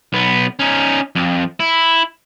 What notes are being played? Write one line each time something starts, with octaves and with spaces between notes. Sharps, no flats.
B1 B3
C#4 D#4
F2
E4